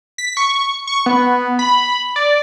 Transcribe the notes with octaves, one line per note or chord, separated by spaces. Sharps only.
B6
C#6
C#6
B3
B5
D5